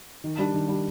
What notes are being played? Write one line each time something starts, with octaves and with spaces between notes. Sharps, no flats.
D#3
G3 D4
D#3
G3 D4